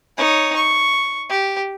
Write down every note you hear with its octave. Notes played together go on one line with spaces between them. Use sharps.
D#4 C#5
C#6
G4